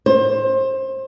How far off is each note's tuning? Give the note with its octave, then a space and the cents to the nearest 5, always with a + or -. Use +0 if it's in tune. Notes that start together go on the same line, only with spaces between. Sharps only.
C5 +25